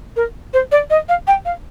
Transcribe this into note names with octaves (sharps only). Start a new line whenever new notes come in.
A#4
C5
D5
D#5
F5
G5
F5